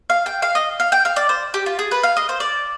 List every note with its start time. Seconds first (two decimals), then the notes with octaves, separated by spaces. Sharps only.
0.10 F5
0.26 G5
0.42 F5
0.55 D#5
0.80 F5
0.92 G5
1.05 F5
1.16 D5
1.29 C5
1.54 G4
1.66 F4
1.79 G#4
1.91 B4
2.03 F5
2.17 D#5
2.29 C5
2.40 D5